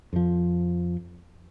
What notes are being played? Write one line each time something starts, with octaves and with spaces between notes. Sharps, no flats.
F2 F3